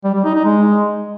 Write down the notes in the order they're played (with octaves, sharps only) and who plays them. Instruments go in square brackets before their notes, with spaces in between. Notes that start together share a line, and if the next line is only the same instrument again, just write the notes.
[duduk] G3
G3
D#4
D#4
G#3